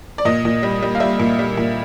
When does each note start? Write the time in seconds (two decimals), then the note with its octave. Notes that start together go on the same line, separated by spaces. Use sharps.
0.18 D5
0.25 A#2 D#5
0.45 A#2
0.63 G3
0.82 G3
0.95 F5
1.00 G3 E5
1.19 A#2
1.39 G3
1.57 A#2